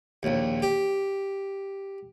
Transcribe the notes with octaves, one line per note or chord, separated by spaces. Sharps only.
A#1 D#2
G4